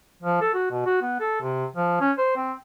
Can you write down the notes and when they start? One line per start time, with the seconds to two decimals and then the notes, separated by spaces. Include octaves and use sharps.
0.23 F3
0.41 A4
0.54 F#4
0.71 B2
0.86 F#4
1.02 B3
1.20 A4
1.41 C3
1.76 F3
2.01 C#4
2.18 C5
2.36 C4